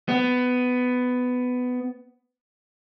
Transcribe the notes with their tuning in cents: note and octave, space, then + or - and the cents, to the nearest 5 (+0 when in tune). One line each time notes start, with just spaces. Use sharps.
B3 +15